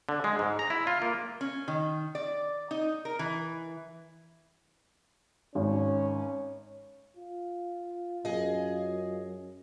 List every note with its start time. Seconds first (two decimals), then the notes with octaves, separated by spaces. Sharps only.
0.09 D3
0.24 G#3
0.39 G#2
0.59 A#5
0.70 E4
0.87 F4
1.02 A#3
1.41 C#4
1.68 D#3
2.15 D5
2.71 D#4
3.05 A#4
3.19 E3
5.55 G#1 C#4
7.16 F4
8.25 F#2 G#4 D#5